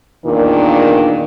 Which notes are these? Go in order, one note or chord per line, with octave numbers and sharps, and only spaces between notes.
E2 A#2 D#3 D4